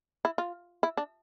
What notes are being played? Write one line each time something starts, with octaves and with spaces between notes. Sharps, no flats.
E4
F4
E4
D4